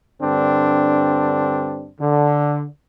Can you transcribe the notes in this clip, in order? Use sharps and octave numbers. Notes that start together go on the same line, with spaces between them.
G2 D3 C4 D4
D3